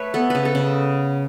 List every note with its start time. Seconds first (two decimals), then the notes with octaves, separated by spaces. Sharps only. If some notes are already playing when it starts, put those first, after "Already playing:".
Already playing: A3 B4 C#5
0.14 B3 A4
0.30 C#3 B4
0.45 A4
0.55 C#3